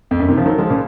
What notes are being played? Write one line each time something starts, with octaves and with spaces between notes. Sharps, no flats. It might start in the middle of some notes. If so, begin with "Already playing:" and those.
F2
F#2
C3 D#3
C#3 F3
D#3 F#3
F3 G#3
A#2 C#3